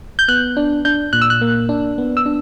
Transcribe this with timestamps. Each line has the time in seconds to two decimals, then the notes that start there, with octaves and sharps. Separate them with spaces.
0.19 G6
0.28 B3 F#6
0.57 D4
0.85 D4 G6
1.13 A#2 F#6
1.22 E6
1.30 F#6
1.41 A#3
1.69 D4
1.98 B3
2.17 E6
2.26 D4